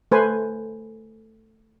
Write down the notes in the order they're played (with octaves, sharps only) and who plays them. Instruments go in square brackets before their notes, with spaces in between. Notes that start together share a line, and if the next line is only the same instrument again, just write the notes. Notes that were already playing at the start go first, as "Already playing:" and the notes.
[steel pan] A3 B4 C5 G#5